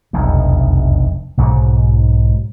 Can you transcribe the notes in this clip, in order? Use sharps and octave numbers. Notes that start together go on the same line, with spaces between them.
F1 B1 E2 G2
B1 G#2 F#3